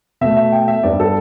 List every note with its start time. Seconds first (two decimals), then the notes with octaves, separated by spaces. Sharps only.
0.21 B2 A3 E5
0.37 E5
0.52 G5
0.68 E5
0.83 G2 G3 B3 D5
1.00 A4